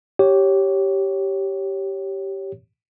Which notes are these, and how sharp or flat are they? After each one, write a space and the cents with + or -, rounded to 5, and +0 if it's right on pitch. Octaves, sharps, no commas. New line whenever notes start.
G4 -10 C#5 +0